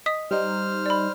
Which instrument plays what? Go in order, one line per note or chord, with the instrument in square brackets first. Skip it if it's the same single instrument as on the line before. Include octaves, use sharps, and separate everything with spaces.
[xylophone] D#5 D#6 B6
[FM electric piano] G3 D#4 [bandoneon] C5 F6
[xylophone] D5 B5